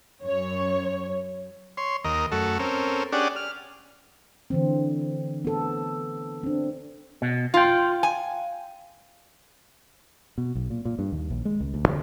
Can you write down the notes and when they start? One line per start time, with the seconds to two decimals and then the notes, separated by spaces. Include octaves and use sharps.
0.23 F#2 C#5
1.77 C#5 C6
2.05 D#2 A#4 D#5
2.32 F#2 A3 F#4 A4
2.59 C4 C#4 A4 A#4
3.12 C#4 D4 G4 G#4 D5 F#5
3.36 F6
4.50 D3 E3 C4
5.45 B3 A4
6.43 C4 D4
7.22 B2
7.54 F4 F5 G5
8.03 G#5
10.38 B2
10.55 B1
10.70 A#2
10.85 A#2
10.99 G2
11.12 D#2
11.30 A#1
11.45 G#3
11.60 C#2
11.74 D2
11.88 D3